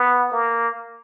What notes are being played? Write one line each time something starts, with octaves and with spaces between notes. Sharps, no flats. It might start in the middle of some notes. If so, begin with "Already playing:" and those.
Already playing: B3
A#3